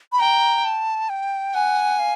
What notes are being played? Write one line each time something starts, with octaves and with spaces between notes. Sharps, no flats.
B5
G5 A#5
A5
G5
F#5 G#5
F5